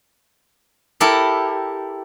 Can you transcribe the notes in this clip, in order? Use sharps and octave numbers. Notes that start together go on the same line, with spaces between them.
E4 G4 A4 A#4